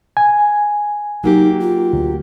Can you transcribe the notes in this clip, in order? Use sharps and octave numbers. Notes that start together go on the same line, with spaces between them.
G#5
F#3 A#3 D#4 G4
F4
D2